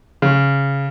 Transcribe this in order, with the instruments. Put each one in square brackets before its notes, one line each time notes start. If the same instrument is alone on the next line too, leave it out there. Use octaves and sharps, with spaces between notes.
[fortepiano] C#3